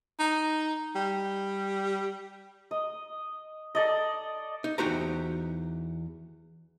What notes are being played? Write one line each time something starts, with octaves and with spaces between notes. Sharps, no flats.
D#4
G3
D#5
A4 D5 D#5
D#4
E2 D#4 F#4 G4 C5 A#5